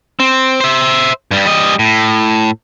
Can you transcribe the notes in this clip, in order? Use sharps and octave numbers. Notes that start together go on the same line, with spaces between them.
C4
C5 E5
G2 G3
G3 D#5
A2